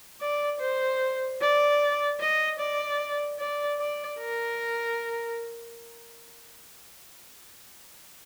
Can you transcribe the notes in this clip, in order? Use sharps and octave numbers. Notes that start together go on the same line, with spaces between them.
D5
C5
D5
D#5
D5
D5
D5
A#4